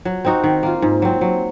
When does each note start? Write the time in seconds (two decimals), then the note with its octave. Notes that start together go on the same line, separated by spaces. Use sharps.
0.05 F#3
0.25 C4 D#4 F#4
0.44 D#3
0.63 A#3 F4
0.82 G#2
1.02 F#3 C4
1.21 F#3